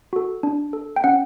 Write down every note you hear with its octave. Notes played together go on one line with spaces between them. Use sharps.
F#4 A4
D4
A4
G5
C#4 F#5